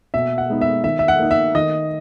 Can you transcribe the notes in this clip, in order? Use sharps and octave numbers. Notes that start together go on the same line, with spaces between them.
B2 E5
F#5
G#3 B3 D#4
E5
D#3 E5
E5
F#5
A#3 D#4
E5
D#3 D#5